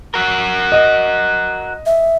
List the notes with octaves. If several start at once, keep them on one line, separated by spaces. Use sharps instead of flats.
F#4 A#4
D#5 D#7
E5